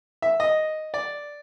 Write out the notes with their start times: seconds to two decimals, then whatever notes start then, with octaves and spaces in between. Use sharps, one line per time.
0.22 E5
0.40 D#5
0.94 D5